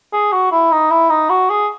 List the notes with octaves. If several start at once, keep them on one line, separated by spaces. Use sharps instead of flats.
G#4
F#4
E4
D#4
E4
D#4
F#4
G#4